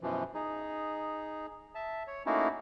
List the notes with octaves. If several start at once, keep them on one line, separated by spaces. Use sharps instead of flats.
F#2 B2 E3 F3
D#4 G#4
E5 A5
C#5
A3 A#3 C#4 D#4 E4 F#4